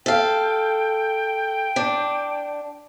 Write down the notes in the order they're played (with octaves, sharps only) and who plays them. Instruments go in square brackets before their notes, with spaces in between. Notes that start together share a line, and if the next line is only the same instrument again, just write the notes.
[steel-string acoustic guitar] A4 F5 [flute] G5
[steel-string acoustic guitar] D4